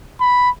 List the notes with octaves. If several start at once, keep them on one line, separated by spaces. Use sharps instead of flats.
B5